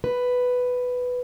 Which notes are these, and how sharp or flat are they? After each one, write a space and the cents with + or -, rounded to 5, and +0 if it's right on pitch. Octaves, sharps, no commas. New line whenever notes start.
B4 +5